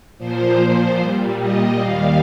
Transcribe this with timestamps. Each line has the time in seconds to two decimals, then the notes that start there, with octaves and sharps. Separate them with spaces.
0.18 A#2 F3 C5
0.98 A#2 G3
1.38 D#5
1.78 D#2 D#3 G3 F5